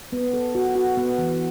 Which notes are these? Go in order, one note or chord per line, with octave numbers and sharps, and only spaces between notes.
B3
A4
F#4
F#4
B3
E3